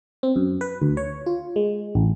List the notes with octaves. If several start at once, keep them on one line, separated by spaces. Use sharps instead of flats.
C4
F#2
B4
D2
C#5
F4
G#3
A1